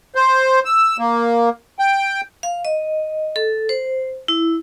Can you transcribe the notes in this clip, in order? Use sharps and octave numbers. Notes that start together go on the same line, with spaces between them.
C5
E6
A#3
G5
F5
D#5
A4
C5
E4